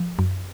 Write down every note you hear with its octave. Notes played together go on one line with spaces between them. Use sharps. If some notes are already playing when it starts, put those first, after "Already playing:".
Already playing: F3
F#2